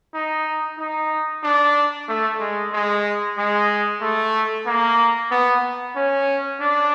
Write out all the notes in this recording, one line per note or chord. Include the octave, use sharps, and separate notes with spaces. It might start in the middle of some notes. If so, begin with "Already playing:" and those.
D#4
D#4
D4
A3
G#3
G#3
G#3
A3
A#3
B3
C#4
D4